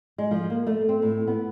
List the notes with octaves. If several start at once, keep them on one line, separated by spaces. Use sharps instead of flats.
G#3
F3
A#3
A3
C4
A2
B3